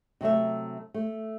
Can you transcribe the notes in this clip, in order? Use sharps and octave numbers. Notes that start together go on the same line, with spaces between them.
C3 F#3 A3 E5
A3